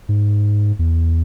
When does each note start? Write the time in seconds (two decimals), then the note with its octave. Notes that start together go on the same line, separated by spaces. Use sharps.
0.09 G#2
0.79 E2